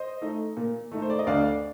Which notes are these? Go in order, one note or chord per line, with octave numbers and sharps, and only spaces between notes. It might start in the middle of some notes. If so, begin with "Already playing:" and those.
Already playing: C5 D#5
A3 D#4
A#2
A3 D#4
C5
D5
D#5
D2 D5 F5